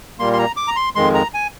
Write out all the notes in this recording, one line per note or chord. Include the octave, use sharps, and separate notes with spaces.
A#2 G3 A#3 C6
C6
A#5
D6
A#5
C6
F2 D#3 G#3 C6
A#5
G#5